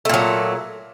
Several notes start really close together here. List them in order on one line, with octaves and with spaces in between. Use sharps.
A3 A#2 F#3